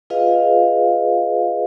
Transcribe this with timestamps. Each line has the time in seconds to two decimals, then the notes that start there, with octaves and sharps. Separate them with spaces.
0.10 F4 G#4 B4 D#5 F5